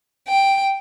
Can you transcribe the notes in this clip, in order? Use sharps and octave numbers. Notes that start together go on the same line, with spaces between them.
G5